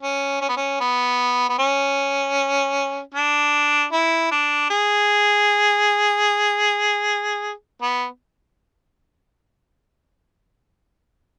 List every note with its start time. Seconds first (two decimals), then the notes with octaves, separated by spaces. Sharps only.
0.02 C#4
0.41 C#4
0.49 B3
0.56 C#4
0.80 B3
1.49 B3
1.59 C#4
3.14 D4
3.92 E4
4.31 D4
4.70 G#4
7.82 B3